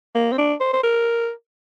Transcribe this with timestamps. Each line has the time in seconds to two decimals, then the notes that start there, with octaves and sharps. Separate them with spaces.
0.15 A#3
0.33 C4
0.38 D4
0.60 C5
0.73 C5
0.83 A#4